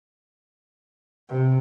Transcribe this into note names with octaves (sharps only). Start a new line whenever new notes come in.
C3